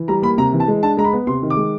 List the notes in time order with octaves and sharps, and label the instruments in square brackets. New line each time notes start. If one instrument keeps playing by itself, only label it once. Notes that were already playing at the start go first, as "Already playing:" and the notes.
Already playing: [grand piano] E3
G3 A#5
A#3 B5
C3 A#5
E3
A5
G#3
D4 A5
G#3 A#5
B5
B3
C3 C6
D#3
D6
G#3